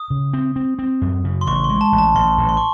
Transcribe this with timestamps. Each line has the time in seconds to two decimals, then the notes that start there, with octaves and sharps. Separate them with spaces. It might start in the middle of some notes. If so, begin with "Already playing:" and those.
Already playing: D#6
0.10 C#3
0.33 C4
0.56 C4
0.79 C4
1.01 F#2
1.24 C#3
1.41 C6
1.47 A1 C#6
1.64 C6
1.70 G#3
1.81 A5
1.92 A1
1.99 A5
2.15 A1 C6
2.38 A1
2.49 C6
2.57 C#6